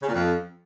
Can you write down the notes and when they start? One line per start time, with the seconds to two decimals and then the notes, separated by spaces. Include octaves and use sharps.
0.01 C#3
0.07 A#2
0.14 F2